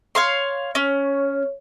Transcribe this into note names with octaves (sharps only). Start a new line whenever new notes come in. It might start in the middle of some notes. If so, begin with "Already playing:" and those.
C#5 F5 C6
C#4 C#5